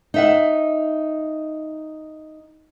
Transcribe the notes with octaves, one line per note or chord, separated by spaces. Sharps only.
D#4 E5 F#5